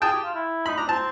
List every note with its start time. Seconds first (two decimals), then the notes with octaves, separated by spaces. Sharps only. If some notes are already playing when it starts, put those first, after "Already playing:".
0.02 G#4 G5 A5
0.13 G4
0.24 F4
0.35 E4
0.66 D#4 B5
0.77 D4 A#5
0.87 C4 A5